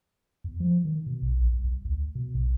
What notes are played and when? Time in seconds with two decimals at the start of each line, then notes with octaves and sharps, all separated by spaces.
0.44 E2
0.60 F3
0.85 D#3
1.06 B2
1.22 B1
1.38 A1
1.53 C2
1.64 C2
1.85 D2
2.15 B2
2.35 B1